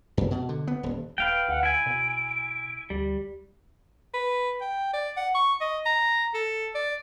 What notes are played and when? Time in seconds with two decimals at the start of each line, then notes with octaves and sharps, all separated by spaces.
0.17 F#2
0.31 B2
0.49 D3
0.67 B3
0.83 D#1
1.18 D#1 B4 F5 G5 D7
1.48 D2 F#5
1.63 E4 G#5 D7
1.86 B2
2.90 D2 G3
4.14 B4
4.61 G5
4.93 D5
5.17 F#5
5.35 C#6
5.61 D#5
5.86 A#5
6.34 A4
6.75 D5